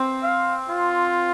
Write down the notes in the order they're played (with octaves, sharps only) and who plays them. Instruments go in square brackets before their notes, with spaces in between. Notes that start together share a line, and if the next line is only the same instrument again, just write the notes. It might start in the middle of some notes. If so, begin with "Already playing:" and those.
Already playing: [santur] C4
[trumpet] F5
F4